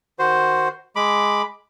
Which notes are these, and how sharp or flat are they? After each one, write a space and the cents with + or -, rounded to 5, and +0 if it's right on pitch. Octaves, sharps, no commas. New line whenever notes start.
D#3 +0 F#4 +0 C5 +0
G#3 +0 B5 +0 D6 +0